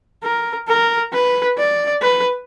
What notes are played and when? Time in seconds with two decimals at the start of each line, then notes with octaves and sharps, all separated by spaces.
0.23 A#4
0.68 A#4
1.12 B4
1.58 D5
2.02 B4